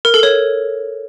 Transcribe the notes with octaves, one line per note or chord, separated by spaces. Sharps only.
A#4
A4
C#5